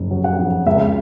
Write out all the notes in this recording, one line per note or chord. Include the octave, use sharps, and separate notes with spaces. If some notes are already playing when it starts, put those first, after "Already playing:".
Already playing: F#1 F2
F#3
F#5
F2
C#2 E5